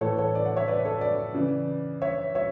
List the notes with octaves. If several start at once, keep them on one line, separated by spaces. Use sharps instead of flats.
A2 E3 A4 C#5
A4 C#5
B4 D5
D5 F#5
C#5 E5
B4 D5
A4 C#5
B4 D5
C#3 E3
C#5 E5
C#5 E5